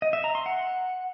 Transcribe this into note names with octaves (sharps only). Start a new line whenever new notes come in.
D#5
E5
A#5
C6
F#5